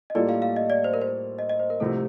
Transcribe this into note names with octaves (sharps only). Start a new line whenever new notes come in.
D#5
A2 G3 A#3 F4 A4 D5
F5
F5
D#5
D5
C5
A#4
C5
D#5
D#5
C5
A#4
C2 C3 F3 A3 A4